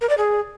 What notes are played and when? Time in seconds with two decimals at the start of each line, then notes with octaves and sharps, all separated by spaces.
0.01 A#4
0.09 D5
0.18 G#4